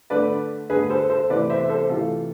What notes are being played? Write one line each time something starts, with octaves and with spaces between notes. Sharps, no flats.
D3 A3 B4 D5
D3 A3 G#4 B4
A4 C5
A4 C5
C3 E3 A3 B4 D5
C5 E5
A4 C5
C3 E3 A3 F4 A4